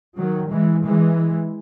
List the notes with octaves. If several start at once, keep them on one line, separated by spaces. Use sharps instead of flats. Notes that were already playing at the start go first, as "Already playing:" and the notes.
D#3 F#3
E3 G#3
E3 G#3